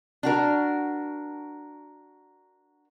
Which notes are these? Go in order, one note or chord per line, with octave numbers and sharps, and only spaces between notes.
D4 F#4 A#4